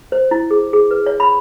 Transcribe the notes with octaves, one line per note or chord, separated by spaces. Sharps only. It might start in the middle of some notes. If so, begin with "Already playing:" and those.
C5
E4
G#4
G#4
B4
C#5
B5